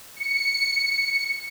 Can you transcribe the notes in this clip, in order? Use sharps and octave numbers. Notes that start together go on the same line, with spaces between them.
C#7